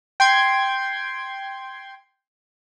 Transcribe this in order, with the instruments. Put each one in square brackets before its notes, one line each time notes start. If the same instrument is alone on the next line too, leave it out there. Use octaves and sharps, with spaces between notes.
[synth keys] G5 C6 G#6